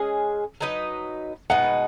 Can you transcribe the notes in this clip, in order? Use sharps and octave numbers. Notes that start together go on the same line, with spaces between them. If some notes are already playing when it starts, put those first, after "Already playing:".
Already playing: G#3 C#4 G#4 D#5
F#3 D#4 B4 D#5
B2 G#3 D#4 B4 F#5